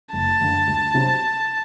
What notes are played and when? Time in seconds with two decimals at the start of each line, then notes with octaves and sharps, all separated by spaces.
0.13 F#1 A5
0.40 F#2 D3 A3
0.67 D2
0.94 C3 F#3 C4